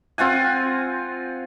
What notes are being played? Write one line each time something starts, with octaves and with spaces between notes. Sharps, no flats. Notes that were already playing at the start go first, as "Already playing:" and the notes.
C4 F4 F#5 G#5